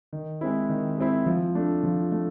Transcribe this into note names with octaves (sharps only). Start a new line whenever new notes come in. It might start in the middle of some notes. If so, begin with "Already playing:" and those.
D#3
G#3 C4 E4
D#3
G#3 C4 E4
F3
A3 D4
F3
A3